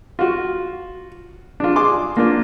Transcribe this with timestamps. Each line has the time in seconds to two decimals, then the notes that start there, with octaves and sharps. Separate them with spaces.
0.19 F4 F#4
1.60 D4 F4
1.76 G#4 C6 D6
2.17 A#3 D4 F4